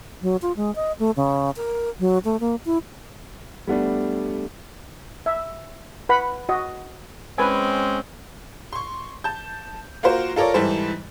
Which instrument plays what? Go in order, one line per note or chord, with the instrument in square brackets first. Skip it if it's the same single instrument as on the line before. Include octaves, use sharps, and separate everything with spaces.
[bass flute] F#3
F4
G#3
D#5
A3
C#3
A#4
F#3
A3
A#3
E4
[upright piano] G3 A3 B3 D4
[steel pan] E5
B4 F#5 B5
F#4 D#5
[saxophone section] G#3 C4 C#4 [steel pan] B4 G#5
[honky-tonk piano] C6 C#6
A5 G6
A#3 F4 F#4 A#4 C5
F4 A4 A#4 C#5 D5
G#2 E3 G3 A4 C5